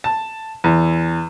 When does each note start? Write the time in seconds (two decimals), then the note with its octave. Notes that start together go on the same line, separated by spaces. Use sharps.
0.04 A5
0.64 E2